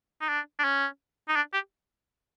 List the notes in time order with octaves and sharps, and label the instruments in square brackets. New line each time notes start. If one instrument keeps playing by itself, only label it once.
[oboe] D#4
D4
D4
C#4
D#4
D4
G4